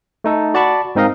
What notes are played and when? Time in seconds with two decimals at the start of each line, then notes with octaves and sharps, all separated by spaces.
0.24 A3 D#4 A4
0.54 F#4 D5 F#5 A5 B5 C#6
0.95 G#2 C4 D#4 A#4 D#5 F5